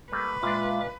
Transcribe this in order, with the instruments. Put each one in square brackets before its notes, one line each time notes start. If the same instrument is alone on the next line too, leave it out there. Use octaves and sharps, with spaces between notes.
[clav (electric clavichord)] G3 A3 A#3 [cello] B4
[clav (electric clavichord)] A#2 D4 [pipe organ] G#3 E5 D6 [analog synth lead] F4